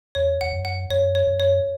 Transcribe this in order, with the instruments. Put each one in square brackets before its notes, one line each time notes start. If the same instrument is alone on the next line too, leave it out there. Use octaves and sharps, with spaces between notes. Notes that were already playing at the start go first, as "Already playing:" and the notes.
[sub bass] E2 [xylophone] C#5
[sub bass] E2 [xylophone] F#5
[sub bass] F#2
[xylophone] F#5
[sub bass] F#2 [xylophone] C#5
[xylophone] C#5
[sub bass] F#2
[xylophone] C#5